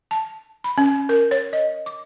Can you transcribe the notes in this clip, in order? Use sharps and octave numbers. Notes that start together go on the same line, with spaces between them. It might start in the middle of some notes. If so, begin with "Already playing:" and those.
A5
B5
C#4
A#4
C#5
D#5
D6